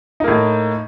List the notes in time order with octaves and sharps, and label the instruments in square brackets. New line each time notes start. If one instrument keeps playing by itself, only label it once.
[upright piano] D#4
A#3
A2